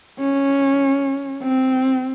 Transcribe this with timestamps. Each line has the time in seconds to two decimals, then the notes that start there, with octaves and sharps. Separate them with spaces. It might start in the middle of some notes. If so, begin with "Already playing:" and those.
0.19 C#4
1.42 C4